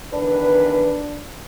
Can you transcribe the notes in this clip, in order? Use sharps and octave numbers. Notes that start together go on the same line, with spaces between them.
E2 D#3 D4 B4